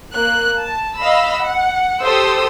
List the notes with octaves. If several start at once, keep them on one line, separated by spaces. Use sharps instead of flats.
A#3 F#6
A5
D#5 F5 B5 E6
F#5
G4 A4 C5 C6 D#6 E6